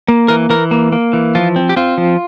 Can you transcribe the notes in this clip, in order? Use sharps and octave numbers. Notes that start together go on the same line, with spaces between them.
A#3
E3 A#4
E3 A#4
A#3
A#3
E3
F3 F4
C4
G4
C4 F4
F3